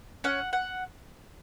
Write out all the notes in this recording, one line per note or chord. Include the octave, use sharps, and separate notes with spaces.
C#4 F#5
F#5